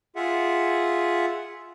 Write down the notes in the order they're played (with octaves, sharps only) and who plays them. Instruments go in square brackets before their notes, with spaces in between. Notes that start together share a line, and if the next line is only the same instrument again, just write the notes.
[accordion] F4 G#4 E5 F#5